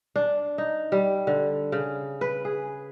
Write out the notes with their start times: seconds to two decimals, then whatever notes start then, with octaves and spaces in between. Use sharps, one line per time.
0.16 D4
0.58 D#4
0.92 G3
1.27 D3
1.72 C#3
2.21 B4
2.45 G#4